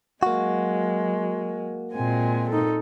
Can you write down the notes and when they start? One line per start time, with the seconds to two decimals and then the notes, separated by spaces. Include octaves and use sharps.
0.23 F#3 G#3 A#3 F#4
1.93 A#2 G#3 C4 G#5
2.50 D#4 A4